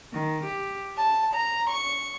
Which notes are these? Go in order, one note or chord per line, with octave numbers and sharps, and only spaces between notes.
D#3
G4
A5
A#5
C#6